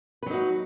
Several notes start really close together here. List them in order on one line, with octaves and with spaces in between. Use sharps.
B4 F#3 D#4 F#4